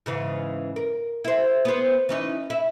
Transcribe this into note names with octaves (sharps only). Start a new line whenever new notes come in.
G#2 C#3 E3
A#4
E4 C5
B3 C5
E3 C#4 D#4
E4 E5